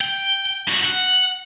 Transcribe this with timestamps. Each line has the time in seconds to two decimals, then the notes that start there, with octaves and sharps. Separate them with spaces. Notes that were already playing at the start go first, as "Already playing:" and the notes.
0.01 G5
0.67 G2 F#4
0.85 F#5